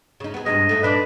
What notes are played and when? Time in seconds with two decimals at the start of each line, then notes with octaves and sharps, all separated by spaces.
0.20 C#3 D#4
0.34 B3 G#4
0.46 G2 C3 G#3 D#5
0.69 G#2 A3
0.83 A#2 D4 B4 D5